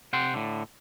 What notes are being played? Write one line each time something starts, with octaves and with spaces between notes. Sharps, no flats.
C3 F#5 G5 C6
A2 D3